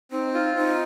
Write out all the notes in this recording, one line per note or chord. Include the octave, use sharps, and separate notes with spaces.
C4 D#4
F4
C4 D#4